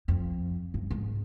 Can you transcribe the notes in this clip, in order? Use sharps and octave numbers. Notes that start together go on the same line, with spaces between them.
F2
G2
G#2